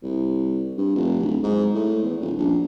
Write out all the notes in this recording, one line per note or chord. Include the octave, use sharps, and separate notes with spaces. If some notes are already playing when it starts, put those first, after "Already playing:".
C2
G2
F1
D1
G#2
A2
E2
D#1
A#1